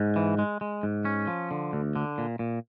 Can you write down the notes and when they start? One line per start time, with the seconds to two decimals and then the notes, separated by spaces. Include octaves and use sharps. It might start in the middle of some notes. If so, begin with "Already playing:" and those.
Already playing: G#2
0.16 E3
0.39 G#3
0.61 G#3
0.83 G#2
1.05 C#4
1.27 F3
1.51 D3
1.73 D2
1.96 D3
2.18 A#2
2.39 A#2